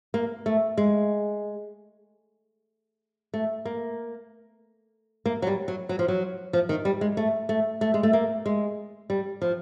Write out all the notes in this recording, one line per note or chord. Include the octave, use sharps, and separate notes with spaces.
A#3
A3
G#3
A3
A#3
A#3
F#3
G3
F#3
F#3
F3
F#3
F3
D#3
G3
G#3
A3
A3
A3
G#3
A3
A#3
G#3
G3
F3